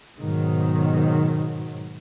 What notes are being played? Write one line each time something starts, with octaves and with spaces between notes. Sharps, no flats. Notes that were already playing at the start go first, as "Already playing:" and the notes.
G#2 B2 D#3 F#3